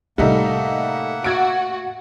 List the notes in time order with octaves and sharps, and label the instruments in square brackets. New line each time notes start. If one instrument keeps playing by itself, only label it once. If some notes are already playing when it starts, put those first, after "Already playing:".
[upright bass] A2 C3 [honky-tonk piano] G3 A3 D#4 [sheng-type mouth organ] A#3 E5 F#5
[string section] F#4 [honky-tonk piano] G#6 A6 D7